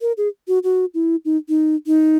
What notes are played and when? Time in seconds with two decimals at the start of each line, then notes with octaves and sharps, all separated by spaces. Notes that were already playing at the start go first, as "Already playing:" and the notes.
0.02 A#4
0.17 G#4
0.48 F#4
0.64 F#4
0.94 E4
1.25 D#4
1.49 D#4
1.87 D#4